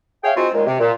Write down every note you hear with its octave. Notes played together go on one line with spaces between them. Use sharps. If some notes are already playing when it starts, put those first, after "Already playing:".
G#4 C#5 E5 F5 G5
G#3 C4 D#4 F4 F#4
D#2 A#2 D#3 G#3
C3
A#2